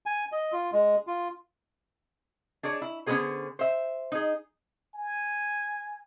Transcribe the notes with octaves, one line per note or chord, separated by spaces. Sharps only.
G#5
D#5
F4
G#3
F4
D4 G#4 C#5 D5
E4
D3 B3 C#4 D#4 G#4 C5
C5 E5
D#4 G#4
G#5